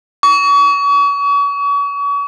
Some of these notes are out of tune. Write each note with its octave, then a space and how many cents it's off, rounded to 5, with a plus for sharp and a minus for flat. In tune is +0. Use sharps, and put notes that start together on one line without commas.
C#6 +40